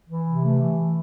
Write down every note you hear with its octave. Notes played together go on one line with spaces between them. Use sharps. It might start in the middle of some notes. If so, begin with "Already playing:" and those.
E3
C3
A3
E3